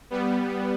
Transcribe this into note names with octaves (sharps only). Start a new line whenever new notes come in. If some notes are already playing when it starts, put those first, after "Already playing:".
G3 B3